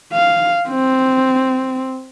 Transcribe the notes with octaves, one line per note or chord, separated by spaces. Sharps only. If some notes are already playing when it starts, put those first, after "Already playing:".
F5
C4